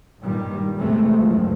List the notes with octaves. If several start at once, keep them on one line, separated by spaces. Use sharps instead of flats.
G2 A#2 D#3 G3
E2 A2 C3 E3 G#3 A3
F#1 C#2 G2 F3